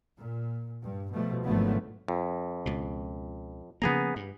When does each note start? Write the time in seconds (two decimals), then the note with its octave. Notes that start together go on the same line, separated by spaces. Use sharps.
0.18 A#2
0.83 G2
1.13 B2 F3 G3 A3
1.45 G#1 D3 F3 F#3 A3 B3
2.08 F2
2.66 C#2 B2
3.82 C#3 F3 A#3 B3 G#4 A#5
4.16 G2